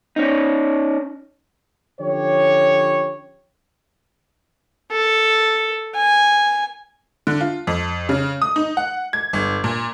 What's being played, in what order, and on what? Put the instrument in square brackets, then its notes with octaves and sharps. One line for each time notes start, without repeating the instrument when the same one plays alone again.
[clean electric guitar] C#4 D#4
[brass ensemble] D3 F3 C#4 G4 C#5
[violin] A4
G#5
[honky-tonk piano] D3
F4
F2
C#3
D#6
D#4
F#5
G#6
G1
A#2